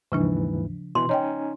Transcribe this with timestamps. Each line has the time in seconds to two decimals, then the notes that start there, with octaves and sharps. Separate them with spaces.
0.12 D#2 G#2 C#3 E3 F3 D4
0.95 B2 E3 C6
1.09 C#4 D#4 C#5 D#5 G5